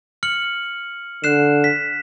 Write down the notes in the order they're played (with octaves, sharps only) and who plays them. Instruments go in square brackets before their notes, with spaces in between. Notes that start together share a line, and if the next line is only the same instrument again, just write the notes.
[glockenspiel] F6 C#7 F#7
[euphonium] D3 [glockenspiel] F#6 C7 E7
[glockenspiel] B6